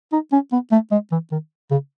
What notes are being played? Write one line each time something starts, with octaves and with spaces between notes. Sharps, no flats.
D#4
C#4
B3
A3
G#3
E3
D#3
C#3